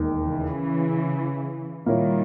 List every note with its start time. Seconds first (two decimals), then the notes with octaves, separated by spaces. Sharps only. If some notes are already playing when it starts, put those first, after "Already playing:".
Already playing: E1 D#2 D#3
0.24 C#3 E3
1.86 A#2 D#3 G3 A#3 E4 A#4 C#5